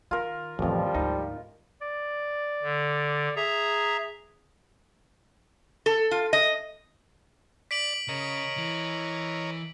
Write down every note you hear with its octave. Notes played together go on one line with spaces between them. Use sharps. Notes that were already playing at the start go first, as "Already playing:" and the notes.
D#3 F4 A#4
A1 F2 D3 E3 F3 G3
D2 G#2 D#4
D5
D3
G#4 E5 A#5
A4
F4
D#5
D5 B6 D7 F#7
C#3 A#4 C#5 D#5
E3